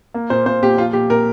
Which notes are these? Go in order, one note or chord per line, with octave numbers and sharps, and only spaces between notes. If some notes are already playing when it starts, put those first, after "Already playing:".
A#3
A#2 C5
A#2 C5
A#2 G4
F3 F4
A#2 G4
A#2 A#4